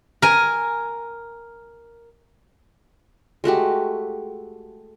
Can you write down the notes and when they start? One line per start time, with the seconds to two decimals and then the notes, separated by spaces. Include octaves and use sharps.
0.22 A#4 G#5
3.44 G#3 A3 F#4 G4